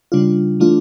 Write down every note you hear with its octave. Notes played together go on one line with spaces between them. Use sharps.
C#3 G3 D4 F4
E3 A3 D4 F4